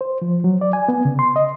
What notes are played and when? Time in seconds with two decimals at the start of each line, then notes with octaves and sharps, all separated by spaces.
0.01 C5
0.22 F3
0.44 F#3
0.61 D5
0.73 G#5
0.89 B3
1.05 C#3
1.19 C6
1.36 D#5